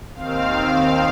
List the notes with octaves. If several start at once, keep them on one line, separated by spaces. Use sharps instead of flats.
D#2 D#3 C4 F5